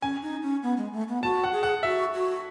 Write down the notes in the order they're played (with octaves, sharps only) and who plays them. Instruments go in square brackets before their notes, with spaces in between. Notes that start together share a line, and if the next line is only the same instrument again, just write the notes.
[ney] C#4 [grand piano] G#5
[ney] D#4
C#4
B3
G#3
A3
B3
[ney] F#4 [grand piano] A5
[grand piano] F#5
[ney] G#4
[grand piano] F#5
[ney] F#4 [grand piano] E5
[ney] F#4